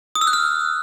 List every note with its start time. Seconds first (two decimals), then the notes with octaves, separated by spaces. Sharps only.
0.15 D#6
0.21 E6
0.27 F#6
0.33 F6